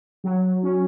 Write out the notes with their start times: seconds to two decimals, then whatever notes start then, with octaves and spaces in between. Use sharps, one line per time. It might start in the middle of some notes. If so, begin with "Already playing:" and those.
0.24 F#3
0.63 C#4